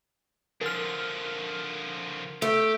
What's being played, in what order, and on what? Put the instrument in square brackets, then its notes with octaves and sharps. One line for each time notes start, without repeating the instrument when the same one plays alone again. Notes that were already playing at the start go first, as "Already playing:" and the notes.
[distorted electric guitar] D3 F3 [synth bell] A#4 F6
[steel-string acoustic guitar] A3 [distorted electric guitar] G4